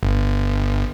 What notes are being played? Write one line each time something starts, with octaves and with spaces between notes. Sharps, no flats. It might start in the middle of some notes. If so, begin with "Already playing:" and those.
G1